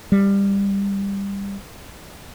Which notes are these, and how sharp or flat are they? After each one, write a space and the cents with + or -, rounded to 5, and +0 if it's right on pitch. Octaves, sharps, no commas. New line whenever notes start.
G3 +20